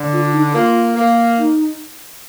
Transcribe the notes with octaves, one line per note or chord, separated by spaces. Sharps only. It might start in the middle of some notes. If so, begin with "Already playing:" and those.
Already playing: D3
F4
D#4
A#3 F4
A#3
D#4